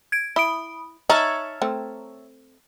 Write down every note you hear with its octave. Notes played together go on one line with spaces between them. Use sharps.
G#6 D7
E4 B5 D#6 D7
D#4 C#5 E5 A5 A#5 F6
A3 C4